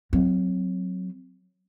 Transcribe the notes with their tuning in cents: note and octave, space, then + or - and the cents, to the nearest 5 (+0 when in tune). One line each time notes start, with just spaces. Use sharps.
F#3 -10 C4 +0